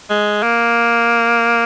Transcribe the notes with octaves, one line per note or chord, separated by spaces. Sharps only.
G#3
A#3